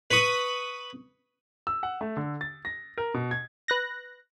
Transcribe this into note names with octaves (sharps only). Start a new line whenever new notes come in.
B4 B5 C#6 D#6
E6
F#5
A3
D3
A6
A#6
A#4
B2
G#6
B4 F#6 A#6